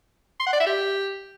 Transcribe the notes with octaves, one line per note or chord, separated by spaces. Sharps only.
C6
F#5
D5
E5
G4